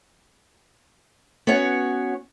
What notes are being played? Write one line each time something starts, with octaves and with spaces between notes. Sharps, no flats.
B3 C#4 F#4 C#5 F#5